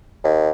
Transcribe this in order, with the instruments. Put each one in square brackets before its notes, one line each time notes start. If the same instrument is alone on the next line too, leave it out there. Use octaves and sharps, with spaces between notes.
[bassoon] D#2